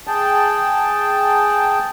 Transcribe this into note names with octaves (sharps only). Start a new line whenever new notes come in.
G#4 G5 A5